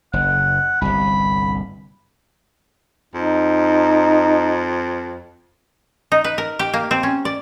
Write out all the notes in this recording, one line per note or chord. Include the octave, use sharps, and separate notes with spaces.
F#1 F#5
G1 C2 B5
F2 D#4
D#4
B4
A#4
G4
A#3
C4
C#4
D5